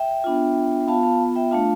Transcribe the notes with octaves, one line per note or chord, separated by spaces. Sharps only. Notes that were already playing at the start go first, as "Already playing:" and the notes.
Already playing: E5 G5
B3 D4 F4
B3 F4 F5 A5
F5 A5
E5 G5
A3 D4 F4 F5 A5